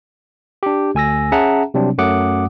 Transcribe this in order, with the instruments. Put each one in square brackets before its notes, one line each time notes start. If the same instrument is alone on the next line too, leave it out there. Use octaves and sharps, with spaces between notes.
[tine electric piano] D4 G4
D2 G#5 E6 A#6
C#4 G#4 E5 F#5 A5 A#5
C3 F#3 G3 C4 D4
F#2 F#3 A3 F#5 D6 D#6